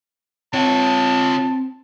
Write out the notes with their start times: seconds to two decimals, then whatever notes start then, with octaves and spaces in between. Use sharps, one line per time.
0.54 C4 F4 C#5 A5